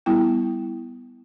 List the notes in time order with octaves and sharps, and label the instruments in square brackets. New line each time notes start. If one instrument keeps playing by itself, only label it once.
[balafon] G3 B3 E4 G5